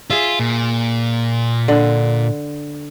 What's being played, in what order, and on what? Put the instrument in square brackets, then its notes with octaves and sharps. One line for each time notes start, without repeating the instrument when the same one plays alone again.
[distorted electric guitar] F4 [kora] G#4 E5
[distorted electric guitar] A#2
[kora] D3